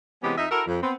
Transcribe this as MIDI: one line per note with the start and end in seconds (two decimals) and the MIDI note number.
0.23 0.37 48
0.23 0.37 52
0.23 0.37 56
0.23 0.37 59
0.23 0.37 61
0.23 0.37 67
0.37 0.46 41
0.37 0.46 63
0.37 0.46 75
0.37 0.46 76
0.50 0.62 64
0.50 0.62 66
0.50 0.62 69
0.50 0.62 70
0.66 0.80 41
0.82 0.93 59
0.82 0.93 60